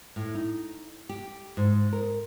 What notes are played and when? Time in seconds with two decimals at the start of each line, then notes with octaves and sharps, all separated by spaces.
0.16 A2
0.35 D#4
1.09 G4
1.57 G#2
1.93 A#4